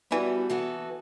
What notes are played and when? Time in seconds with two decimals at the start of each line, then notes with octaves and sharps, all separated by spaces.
0.11 E3 G3 B3 F#4 A4
0.50 E3 B3 F#4 A4